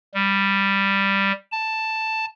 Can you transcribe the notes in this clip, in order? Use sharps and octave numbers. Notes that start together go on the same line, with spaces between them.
G3
A5